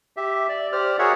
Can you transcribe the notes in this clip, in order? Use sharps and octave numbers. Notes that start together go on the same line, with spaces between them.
G4 E5
D5
G4 C5 D5 F6
F#4 G#4 A#4 C#5 E5 F#5